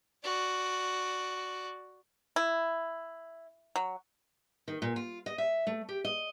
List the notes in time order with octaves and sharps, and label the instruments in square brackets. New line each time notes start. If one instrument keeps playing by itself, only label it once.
[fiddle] F#4 D5
[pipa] E4
F#3
[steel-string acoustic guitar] D#3
A#2
F4
D#5
E5
A3
G4
D#5